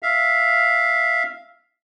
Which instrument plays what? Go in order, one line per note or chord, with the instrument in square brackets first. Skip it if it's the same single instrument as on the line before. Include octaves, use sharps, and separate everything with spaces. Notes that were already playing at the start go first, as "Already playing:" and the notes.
[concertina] E5 F5